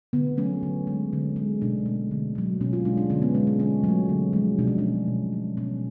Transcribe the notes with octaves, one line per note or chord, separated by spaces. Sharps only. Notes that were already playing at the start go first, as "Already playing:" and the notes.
D3 B3
F#3 A3 C#4
D3
G#3
D3
G#3
B2 D4
A3
D3
F#3 A3
B2 C#4
F4
G#3 D4
D4
D3 C#4
B3
G#3 C#4
C#4
D3 C#4
F#3 A3
D3
F3 G#3
B2 D4
C#4
D4
A3
B2
A3
B2 C#4